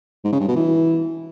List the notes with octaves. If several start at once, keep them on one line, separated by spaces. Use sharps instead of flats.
G#2
C#3
G2
B2
E3